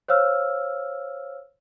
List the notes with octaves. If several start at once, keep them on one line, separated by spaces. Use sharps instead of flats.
C5 C#5 F5 E6 F6